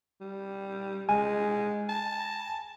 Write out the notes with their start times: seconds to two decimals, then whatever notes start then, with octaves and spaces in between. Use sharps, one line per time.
0.21 G3
1.09 G#3 G#5
1.89 A5